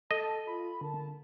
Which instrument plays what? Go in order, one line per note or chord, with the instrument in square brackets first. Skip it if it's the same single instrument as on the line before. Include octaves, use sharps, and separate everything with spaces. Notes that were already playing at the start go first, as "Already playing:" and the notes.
[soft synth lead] A4 [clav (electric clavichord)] D#5 [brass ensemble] A5
[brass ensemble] F4 [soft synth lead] B5
[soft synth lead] D3 [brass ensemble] A#4 A5